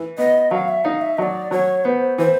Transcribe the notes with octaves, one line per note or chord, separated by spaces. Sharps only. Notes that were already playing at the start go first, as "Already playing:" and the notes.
Already playing: E3
B3 D#5
F#3 F5
E5
D#4 F5
E5
F#3 D5 D#5
F#3 C#5
B3 C5
E3 C5